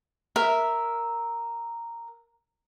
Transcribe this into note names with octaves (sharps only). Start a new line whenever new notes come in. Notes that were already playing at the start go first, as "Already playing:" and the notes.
A#4 E5